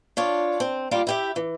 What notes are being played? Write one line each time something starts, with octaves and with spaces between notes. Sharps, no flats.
D4 F4 C#5
C4
G3 A#3 F4
E4 G4 E5
E3